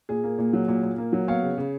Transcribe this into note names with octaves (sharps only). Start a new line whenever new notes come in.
A#2 G#4
A#3
A#2
F#3
A#2
A#2
A#3
F#3
B3 C#5 F5
C#3
C#3